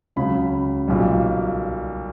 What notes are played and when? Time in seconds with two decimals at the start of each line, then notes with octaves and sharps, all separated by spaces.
0.16 C#2 C#3 F#3 B5
0.88 B1 A#2 G3